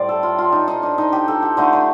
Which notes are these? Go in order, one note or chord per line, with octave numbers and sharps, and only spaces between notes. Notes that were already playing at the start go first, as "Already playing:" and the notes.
Already playing: A2 G3 C5 D5
A4
F4
F4
D#4
D#4
D4
D#4
G4
A4
G4
D3 A3 D#4
D4